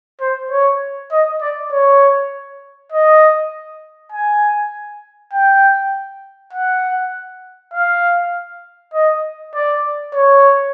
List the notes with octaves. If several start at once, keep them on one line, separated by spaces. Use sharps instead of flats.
C5
C#5
D#5
D5
C#5
D#5
G#5
G5
F#5
F5
D#5
D5
C#5